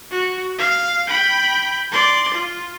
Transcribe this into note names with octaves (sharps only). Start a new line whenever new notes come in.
F#4
F5
G5 B5
D5 C6
F4